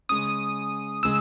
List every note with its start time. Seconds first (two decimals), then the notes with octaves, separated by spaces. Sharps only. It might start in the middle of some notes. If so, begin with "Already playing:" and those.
0.09 C#3 G#3 C#4 D#6
1.03 C#3 G#3 E6